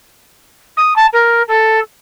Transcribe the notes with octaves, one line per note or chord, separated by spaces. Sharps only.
D#6
A5
A#4
A4